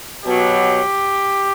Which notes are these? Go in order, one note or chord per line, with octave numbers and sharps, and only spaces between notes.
B2 F#3 G4